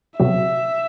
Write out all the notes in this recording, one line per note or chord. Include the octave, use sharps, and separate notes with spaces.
C3 F#3 B3 F#4 E5